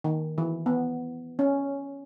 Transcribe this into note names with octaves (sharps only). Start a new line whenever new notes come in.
D#3
E3
B3
C#4